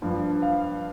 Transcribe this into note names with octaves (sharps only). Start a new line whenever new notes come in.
G2 F3
F5